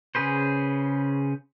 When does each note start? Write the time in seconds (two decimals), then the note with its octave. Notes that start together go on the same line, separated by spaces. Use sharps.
0.15 C#3 C#4 G#4 B4 C5